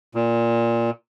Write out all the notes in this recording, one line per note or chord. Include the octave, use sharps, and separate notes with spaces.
A#2